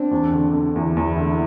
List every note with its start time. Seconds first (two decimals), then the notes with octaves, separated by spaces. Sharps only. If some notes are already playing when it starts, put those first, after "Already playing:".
Already playing: C4 D4
0.11 E2
0.32 D3
0.53 D3
0.75 E2 E4
0.97 E2
1.18 D3